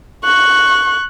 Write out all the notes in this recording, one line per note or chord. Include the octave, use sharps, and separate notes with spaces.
C#6 F#6